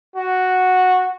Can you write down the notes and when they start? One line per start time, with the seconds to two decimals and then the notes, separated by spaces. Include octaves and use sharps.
0.16 F#4